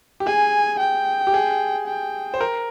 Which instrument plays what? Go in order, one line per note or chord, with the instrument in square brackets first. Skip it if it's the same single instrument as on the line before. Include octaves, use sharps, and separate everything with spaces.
[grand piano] G4
[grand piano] G#4 [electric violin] G#5
[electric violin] G5
[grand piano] G4
G#4
[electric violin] G5
[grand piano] C5
A#4